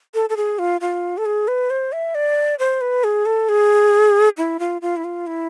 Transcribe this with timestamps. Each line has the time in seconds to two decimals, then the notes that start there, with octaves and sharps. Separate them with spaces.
0.14 A4
0.29 A4
0.37 G#4
0.59 F4
0.81 F4
1.17 A4
1.25 G#4
1.48 B4
1.70 C5
1.92 E5
2.15 D5
2.59 C5
2.81 B4
3.04 G#4
3.26 A4
3.49 G#4
4.37 E4
4.59 F4
4.82 F4
4.96 E4
5.04 F4
5.27 E4